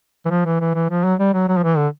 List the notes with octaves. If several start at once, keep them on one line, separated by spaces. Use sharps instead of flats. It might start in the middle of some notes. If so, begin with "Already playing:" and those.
E3
F3
E3
E3
E3
F3
F#3
G3
F#3
F#3
F3
E3
D3